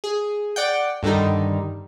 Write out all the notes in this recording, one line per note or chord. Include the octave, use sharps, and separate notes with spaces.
G#4
D5 F#5 G5
G2 D3 D#3 G3 D#4